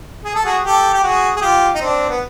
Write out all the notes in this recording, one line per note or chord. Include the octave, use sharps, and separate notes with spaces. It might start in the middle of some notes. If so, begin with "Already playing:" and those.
G#4
A4
F#4 G#4
G4 A4
G4
F#4 G#4
G#4
F4 G4
D#4
C4 D4
B3